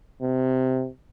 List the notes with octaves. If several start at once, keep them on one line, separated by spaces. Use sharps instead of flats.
C3